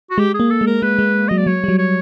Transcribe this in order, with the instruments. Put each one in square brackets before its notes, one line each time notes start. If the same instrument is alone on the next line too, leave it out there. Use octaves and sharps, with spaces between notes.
[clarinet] F#4
[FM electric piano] G#3 [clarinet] G4
[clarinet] G#4
[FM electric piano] A#3
[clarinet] A4
[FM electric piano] G#3
[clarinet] A#4
[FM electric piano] G#3 [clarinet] B4
[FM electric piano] G#3
[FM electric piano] F#3 [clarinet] D#5
[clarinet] D5
[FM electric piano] F#3 [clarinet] C#5
[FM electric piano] G3
F#3
[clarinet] C#5